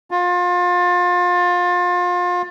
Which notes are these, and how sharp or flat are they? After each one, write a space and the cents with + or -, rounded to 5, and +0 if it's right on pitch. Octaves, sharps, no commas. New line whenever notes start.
F4 +30